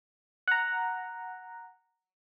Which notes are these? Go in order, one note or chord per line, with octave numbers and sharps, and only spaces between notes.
F#5 A#5